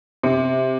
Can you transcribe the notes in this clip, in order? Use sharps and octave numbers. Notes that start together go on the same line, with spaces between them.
C3